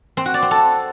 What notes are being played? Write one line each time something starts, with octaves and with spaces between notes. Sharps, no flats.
C4
F#4
D5
C4
A4